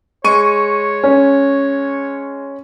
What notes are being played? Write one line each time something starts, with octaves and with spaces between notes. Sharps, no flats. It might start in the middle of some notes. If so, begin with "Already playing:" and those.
G#3 C#5 C#6 D#7
C#4